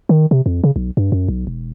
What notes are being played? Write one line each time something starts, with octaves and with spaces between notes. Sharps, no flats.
D#3
C3
F2
C#3
B1
G2
F#2
B1
E1